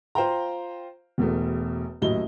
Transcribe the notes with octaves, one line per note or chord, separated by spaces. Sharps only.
F4 C5 F5 G5 A#5
E1 E2 A3
D#1 F#2 A2 D#5 G7